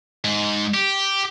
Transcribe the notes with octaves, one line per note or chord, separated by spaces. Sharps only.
G#2
G4